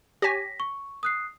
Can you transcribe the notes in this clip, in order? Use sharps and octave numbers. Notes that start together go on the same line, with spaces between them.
G4 C#5 G#5 A#6 B6
C#6
D#6 F#6 C7